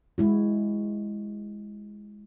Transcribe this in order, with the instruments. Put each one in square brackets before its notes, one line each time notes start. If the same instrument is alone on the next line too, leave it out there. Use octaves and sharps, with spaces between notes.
[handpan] G#3 E4 F#4